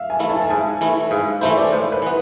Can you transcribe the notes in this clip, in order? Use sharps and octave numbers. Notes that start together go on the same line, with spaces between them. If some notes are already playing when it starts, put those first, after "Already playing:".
Already playing: E5 F5
G#5
E3 A3 E4
A5
A5
G#2 G#5
E3 A3 E4
G#2 F5
E3 A3 E4 C5
D5
A2 C5
B4
E3 B3